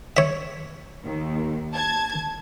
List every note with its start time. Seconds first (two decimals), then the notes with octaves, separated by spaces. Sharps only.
0.17 C#5 E5
1.04 D#2 D#3
1.74 A5 G#6